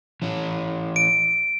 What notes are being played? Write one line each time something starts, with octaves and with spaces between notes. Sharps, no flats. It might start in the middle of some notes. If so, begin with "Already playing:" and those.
E3 C#4
D7